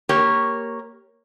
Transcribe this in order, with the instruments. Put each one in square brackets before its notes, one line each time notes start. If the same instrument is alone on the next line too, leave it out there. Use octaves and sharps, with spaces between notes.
[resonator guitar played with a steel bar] A#3 G4 A#4 C#5